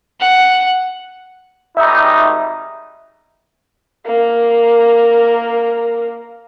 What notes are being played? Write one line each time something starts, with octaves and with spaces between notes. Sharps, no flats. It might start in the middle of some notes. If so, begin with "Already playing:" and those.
F#5
G#1 G3 D#4 E5
A#3 A#4